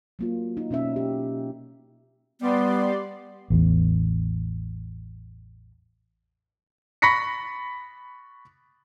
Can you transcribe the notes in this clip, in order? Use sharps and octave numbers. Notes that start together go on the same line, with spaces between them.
F#3 A#3 F4
D#4
B2 C#4 D#4 E5
G4
G3 B3 D5 C6
A1 E2
B5 C#6 A#6 B6 C#7